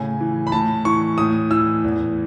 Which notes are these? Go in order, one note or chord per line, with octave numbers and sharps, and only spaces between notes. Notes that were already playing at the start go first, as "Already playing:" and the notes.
Already playing: A2 C#3 G#5
E3
B5
A2 A5
E3 C#6
A2 D#6
E3 E6
E2